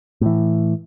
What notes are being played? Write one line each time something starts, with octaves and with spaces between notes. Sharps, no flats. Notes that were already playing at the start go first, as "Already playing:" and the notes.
A2 E3